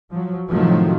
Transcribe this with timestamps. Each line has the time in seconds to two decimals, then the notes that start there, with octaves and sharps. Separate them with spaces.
0.11 F3 F#3
0.51 A2 C3 D#3 F3 F#3 A3